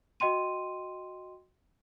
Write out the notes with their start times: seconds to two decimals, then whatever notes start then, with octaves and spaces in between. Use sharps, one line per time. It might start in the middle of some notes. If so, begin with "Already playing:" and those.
0.20 F#4 D#5 G5 C6 D#7